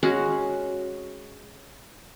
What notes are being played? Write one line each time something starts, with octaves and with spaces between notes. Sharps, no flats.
G#3 C#4 F#4